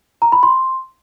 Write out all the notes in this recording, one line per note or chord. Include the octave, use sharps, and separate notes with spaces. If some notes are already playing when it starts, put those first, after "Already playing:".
A#5
B5
C6